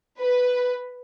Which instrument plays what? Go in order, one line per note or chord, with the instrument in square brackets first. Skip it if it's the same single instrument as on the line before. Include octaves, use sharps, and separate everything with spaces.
[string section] B4